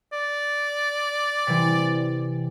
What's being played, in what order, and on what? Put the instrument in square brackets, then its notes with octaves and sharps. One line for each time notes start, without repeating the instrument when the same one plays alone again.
[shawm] D5
[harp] C3 E3